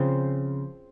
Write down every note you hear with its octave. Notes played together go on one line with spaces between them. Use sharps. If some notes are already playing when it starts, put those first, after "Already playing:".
Already playing: C#3 F3 C4